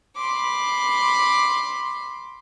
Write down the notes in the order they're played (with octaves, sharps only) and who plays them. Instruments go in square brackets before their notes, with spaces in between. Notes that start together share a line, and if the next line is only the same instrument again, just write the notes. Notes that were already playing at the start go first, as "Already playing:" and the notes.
[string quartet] B5 C6 D6